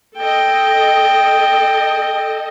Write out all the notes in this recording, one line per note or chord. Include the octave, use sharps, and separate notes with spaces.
A4 D#5 G5